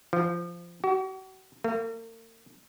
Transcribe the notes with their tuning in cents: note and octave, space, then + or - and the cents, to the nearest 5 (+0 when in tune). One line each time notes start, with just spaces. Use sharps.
F3 -15
F#4 +40
A#3 -45